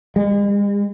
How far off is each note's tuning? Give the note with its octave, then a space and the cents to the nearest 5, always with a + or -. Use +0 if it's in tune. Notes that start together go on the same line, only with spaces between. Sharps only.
G#3 -45